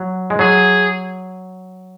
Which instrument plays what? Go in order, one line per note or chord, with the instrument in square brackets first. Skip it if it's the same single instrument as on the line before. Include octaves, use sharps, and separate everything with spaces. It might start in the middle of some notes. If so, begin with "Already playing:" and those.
Already playing: [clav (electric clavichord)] F#3
G#3
[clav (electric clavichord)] F#3 [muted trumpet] G#4